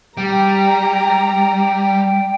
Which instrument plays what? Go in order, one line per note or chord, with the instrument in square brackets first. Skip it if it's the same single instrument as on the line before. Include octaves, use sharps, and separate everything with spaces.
[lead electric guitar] G3 [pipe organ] G5 [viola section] A#5